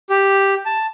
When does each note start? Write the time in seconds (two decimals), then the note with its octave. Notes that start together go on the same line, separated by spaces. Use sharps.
0.10 G4
0.66 A5